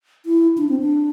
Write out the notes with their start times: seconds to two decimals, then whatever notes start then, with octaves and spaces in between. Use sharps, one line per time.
0.26 E4
0.58 D4
0.69 C4
0.80 D4